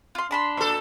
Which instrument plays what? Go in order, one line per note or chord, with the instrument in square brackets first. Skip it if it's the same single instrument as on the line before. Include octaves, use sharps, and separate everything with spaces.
[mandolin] F4 C6
[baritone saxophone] D4 [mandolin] A5 B5 C6
[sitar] A#2 A4